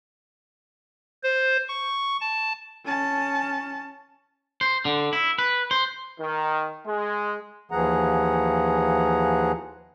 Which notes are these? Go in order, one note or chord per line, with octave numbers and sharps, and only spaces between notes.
C5
C#6
A5
C#4 A5
C5
D3
E4
B4
C5
D#3
G#3
D#2 E3 F3 G#4 F#5 A#5